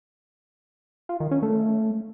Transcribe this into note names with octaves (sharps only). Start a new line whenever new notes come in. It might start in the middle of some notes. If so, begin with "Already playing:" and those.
F4
D#3
C#4
A3